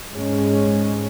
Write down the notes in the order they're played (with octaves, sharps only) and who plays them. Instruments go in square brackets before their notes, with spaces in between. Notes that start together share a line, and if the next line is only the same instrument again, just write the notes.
[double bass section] G#2 G#3 C#4